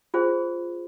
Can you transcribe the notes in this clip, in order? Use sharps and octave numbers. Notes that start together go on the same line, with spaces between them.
F4 G#4 C5